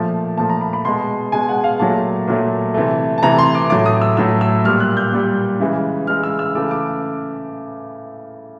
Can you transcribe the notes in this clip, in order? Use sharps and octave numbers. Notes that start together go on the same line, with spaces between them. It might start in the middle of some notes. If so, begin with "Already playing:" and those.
Already playing: A#2 F3 A3
A#2 F3 A3 A5
A#5
B5
B5
B2 G#3 C6
B2 G#3 G#5
F#5
F5
A#2 F#3 A3 A5
A#2 F#3 A3
C3 E3 A3
A5
C3 E3 A3 A#5
C6
D6
A2 F#3 A3 D6
D#6
E6
A2 F#3 A3 E6
E6
A#2 G3 F6
F#6
G6
A#2 G3
C#3 E3 G#3
C#3 E3 G#3 F6
E6
E6
C#3 E3 A3 D6
D6